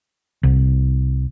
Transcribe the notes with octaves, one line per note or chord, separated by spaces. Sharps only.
C2